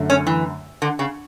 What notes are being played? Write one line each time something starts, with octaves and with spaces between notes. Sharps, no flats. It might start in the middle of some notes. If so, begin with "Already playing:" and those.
Already playing: F#2 D3 A3
C#4
E3
D3
C#3